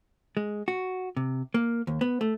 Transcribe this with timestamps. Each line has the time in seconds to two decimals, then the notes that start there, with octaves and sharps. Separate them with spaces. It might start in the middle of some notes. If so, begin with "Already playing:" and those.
0.37 G#3
0.68 F#4
1.17 C3
1.54 A#3
1.87 D#2
2.01 B3
2.21 A3